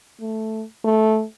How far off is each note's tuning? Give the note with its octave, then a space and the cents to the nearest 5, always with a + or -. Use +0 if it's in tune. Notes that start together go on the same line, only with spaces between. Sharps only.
A3 +0
A3 -10